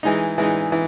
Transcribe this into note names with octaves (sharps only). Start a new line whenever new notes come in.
E3 G#3 D#4
E3 G#3 D#4
E3